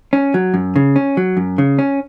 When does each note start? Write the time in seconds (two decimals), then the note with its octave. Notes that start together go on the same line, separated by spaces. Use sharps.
0.13 C#4
0.34 F#3
0.54 F#2
0.76 C#3
0.96 C#4
1.17 F#3
1.37 F#2
1.58 C#3
1.79 C#4